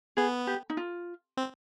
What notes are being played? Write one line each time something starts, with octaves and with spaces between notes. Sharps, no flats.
B3 G#4
G4
D#4
F4
C4